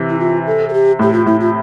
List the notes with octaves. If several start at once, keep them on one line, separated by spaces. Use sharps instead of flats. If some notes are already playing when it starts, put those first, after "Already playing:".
Already playing: C3 E3
E4
F4
A4
A4
G4
A2 G4
F4
A2 E4
F4